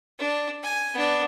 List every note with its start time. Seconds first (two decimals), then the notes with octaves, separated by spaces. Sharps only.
0.19 D4
0.63 G#5
0.94 B3 D4